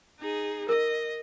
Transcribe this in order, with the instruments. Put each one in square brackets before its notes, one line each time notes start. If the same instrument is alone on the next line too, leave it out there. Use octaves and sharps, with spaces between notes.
[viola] D#4 G#4
[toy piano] A#4 [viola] D#5